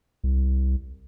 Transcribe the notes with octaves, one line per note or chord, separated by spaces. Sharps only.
C2